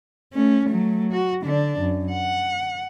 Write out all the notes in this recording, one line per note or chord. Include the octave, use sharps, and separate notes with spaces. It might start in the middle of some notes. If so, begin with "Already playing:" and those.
A3 C#4
F#3 A3
F#4
D3 D4
F#2
F#5